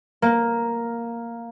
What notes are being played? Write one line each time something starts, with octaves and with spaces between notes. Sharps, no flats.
A#3